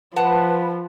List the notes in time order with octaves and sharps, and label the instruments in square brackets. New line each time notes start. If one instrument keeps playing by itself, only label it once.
[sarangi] F3 [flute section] B4 [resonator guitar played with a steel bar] F#5 A5